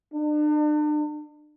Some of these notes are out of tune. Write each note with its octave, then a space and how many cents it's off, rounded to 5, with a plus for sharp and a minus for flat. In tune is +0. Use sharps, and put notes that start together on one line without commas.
D4 +40